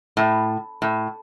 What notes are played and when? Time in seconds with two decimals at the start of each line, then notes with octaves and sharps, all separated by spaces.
0.17 A2
0.82 A2